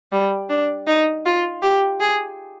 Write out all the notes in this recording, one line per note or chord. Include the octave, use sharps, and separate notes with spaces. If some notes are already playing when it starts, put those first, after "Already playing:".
G3
D4
D#4
F4
G4
G#4